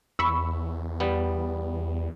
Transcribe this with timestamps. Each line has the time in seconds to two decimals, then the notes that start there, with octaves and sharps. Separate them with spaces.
0.19 E2 B5 C#6 E6
1.00 G3 B3